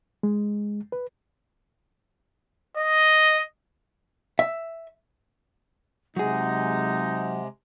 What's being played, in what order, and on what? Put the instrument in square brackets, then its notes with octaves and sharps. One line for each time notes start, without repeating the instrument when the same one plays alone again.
[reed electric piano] G#3
B4
[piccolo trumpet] D#5
[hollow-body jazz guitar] E5
[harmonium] C3 G#3 [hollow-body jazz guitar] F#3 G#4 [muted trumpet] D#4 [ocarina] F#5